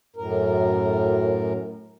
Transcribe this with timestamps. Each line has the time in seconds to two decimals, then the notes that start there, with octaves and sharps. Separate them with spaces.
0.16 F#2 A2 A#4